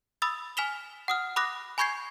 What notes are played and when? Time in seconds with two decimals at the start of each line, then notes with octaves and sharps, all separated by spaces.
0.22 B5 D#6 E6 A6
0.57 G#5 F6 B6 E7 F7 G7
1.08 F#5 D#6 F6
1.36 B5 D6 D#6 F#6 A#6
1.78 G#5 B5 C#6 G6 G#6 C7